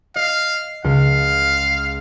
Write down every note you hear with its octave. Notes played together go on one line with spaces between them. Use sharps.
D#5 F5
C#2 F5